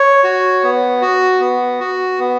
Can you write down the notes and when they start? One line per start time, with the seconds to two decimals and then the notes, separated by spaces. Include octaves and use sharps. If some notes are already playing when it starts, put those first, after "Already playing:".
Already playing: C#5
0.24 F#4
0.63 B3
1.02 F#4
1.41 B3
1.80 F#4
2.19 B3